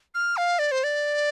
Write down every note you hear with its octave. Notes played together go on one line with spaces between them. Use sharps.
F6
F5
D5
C5
D5